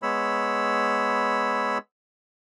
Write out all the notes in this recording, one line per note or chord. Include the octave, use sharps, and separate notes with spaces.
G#3 B3 C#5 B5 E6